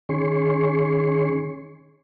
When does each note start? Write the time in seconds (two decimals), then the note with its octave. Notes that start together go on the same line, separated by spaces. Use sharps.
0.09 D#3 C#4 G#4 C6 C#6